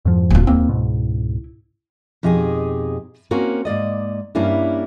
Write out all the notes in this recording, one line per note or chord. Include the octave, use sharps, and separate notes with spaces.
F2 G#2 F3
D1 F4
D#2 A#3 C4 E4
C#2 G#2 B2
F2 B2 D#4 G4 G#4 D#5
A#3 C4 C#4 F#4 A#4
G#2 A#3 D5 D#5
G2 G3 A#3 C#4 D4 E4